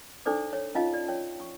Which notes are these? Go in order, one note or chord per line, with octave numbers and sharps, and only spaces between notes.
D4 D#4 A4 C5 D5 D6
C#5
C#4 D#4 F4 D#5 F5 A5
D5
C#5 G5
C#6